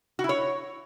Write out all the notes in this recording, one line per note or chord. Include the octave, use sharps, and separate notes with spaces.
F#4
E4
C#5